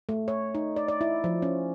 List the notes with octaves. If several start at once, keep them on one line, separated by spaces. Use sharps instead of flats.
A3
C#5
D#4
D5
D5
E4
F3
C#4